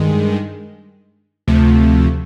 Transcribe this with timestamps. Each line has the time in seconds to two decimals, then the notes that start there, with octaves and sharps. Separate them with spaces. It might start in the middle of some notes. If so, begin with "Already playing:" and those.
Already playing: G2 D#3 G#3
1.47 D2 C3 F3 A3